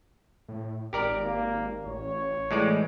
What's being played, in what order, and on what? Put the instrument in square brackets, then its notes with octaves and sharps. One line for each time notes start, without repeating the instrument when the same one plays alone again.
[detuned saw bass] A2
[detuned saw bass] G#1 [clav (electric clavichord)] G4 A#4 D5
[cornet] A#3
[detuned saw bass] A1 [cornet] C#5
[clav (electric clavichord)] A2 G#3 D5 [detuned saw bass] E3